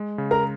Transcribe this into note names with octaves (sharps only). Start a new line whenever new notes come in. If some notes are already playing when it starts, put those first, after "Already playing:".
Already playing: G#3
C#3
A#4 A#5